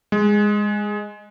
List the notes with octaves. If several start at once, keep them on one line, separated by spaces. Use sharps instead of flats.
G#3